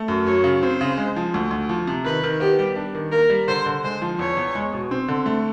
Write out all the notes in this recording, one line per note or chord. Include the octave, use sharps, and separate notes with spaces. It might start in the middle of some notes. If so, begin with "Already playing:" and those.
Already playing: A3
F#2
F#3 C#5
C#3
C4 C5
C#3
G#3
F3
D2
D2
F3
C3
D#3 B4
D#3
B3 G4
G3
D4
D#3
A#3 A#4
G3
D3 C5
D3
G#3 C5
F3
E2 C#5
E2
G#3
B2
C4
D3
A3